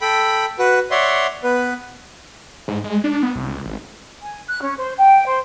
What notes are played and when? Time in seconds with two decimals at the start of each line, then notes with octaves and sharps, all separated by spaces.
0.01 A4 G5 B5
0.59 F#4 B4
0.91 C#5 D5 E5 F#5 C6
1.43 B3 B4
2.68 G#2
2.84 G#3
3.04 D4
3.23 B3
3.35 C2
3.48 C#2
3.65 G#1
4.22 G#5
4.49 F#6
4.61 C#4
4.77 C5
4.97 G5
5.27 C5